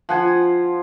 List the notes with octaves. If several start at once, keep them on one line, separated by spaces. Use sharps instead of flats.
F3 F#5 G#5